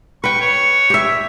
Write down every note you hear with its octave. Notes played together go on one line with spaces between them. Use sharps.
B4 G5 C#6
C#5
G4 E5